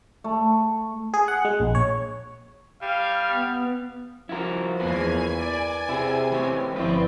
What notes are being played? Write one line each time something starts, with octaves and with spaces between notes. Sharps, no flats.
A3
G#4
F#5
G#3
A#1
C#5
G3 F5
B3
F3 E4 F#4 A#4
E2 A#3 B3 E4 A#4 B4 G#5
D5
C3 E4 G#4
E3 A3 C4 G4
G1 A2 F3 C4 E4 B4 D5